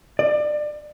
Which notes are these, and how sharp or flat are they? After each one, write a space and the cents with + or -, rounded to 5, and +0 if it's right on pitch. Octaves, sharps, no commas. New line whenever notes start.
D5 +25